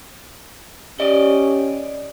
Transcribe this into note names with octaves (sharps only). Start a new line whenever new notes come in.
C#4 G4 D5 D#5